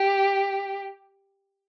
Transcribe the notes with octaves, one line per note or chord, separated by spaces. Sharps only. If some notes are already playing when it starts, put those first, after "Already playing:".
Already playing: G4